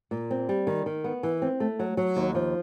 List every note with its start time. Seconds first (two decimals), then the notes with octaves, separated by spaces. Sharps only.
0.11 A#2
0.31 C4
0.49 G3
0.67 D#3
0.86 D#3
1.04 B3
1.23 E3
1.42 C4
1.60 A3
1.79 F#3
1.97 F#3
2.16 D#2
2.35 F3